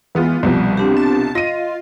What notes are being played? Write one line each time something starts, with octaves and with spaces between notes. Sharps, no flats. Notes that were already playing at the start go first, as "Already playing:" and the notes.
E3 G#3 B3 F4
C2 B2 F3 G3
C4 D4 G4
A5
F4 D#5 A#6 D#7